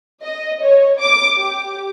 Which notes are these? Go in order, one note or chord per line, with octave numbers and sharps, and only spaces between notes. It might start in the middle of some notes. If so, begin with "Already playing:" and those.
D#5
C#5
D6
G4